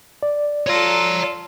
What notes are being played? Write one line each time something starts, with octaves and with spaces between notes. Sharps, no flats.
D5
F4 A4 C#5 A#5